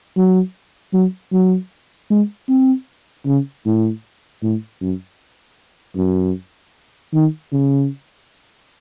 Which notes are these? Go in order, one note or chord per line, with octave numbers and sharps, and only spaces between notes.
F#3
F#3
F#3
G#3
C4
C#3
A2
A2
F#2
F#2
D#3
C#3